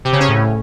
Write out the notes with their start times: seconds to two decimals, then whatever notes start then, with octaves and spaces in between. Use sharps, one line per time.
0.05 C3
0.13 C#3
0.20 C#4
0.28 A2